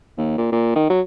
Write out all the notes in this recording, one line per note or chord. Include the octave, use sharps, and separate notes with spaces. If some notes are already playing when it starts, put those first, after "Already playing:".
D#2
A#2
A#2
D#3
F#3